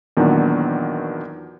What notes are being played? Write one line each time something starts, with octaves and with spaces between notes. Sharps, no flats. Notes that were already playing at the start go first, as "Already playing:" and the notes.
E2 A#2 D#3 F#3 B3 D4